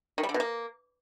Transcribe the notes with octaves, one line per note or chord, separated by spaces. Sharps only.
D#3
G3
D3
B2
A#3